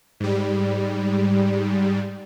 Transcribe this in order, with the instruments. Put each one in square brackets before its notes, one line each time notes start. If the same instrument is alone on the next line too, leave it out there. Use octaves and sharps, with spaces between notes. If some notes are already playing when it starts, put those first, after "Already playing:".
[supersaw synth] G#2 G3